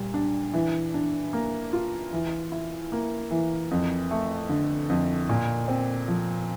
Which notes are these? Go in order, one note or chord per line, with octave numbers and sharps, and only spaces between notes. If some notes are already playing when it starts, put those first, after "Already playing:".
Already playing: A#2 G3
D4
E3
D4
A#3
F4
E3
E4
A#3
E3
F2
A3
D3
F2
A#2
C4
F3